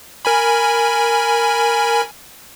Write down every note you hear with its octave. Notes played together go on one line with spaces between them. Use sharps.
A#4 G#5 B5